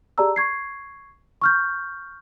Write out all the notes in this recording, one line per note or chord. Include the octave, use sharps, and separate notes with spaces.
G4 G#4 D5 A5 A#5 E6
C#6 G#6 C7
C#6 F6 G6